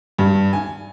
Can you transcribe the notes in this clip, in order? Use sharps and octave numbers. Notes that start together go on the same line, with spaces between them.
G2
G#5